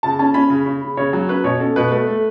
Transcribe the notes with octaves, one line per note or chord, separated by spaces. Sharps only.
C#3 A5
C#4 A5
C#4 B5
C#3
C#3
C#3
C#3 C#5
F#3
C#4 B4
B2 C#5
C#4 A4
B2 B4
A3 B4
A3